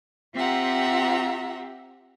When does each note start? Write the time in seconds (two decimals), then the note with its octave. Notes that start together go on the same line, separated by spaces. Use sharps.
0.34 C4 F4 G4 E5 F#5 A#5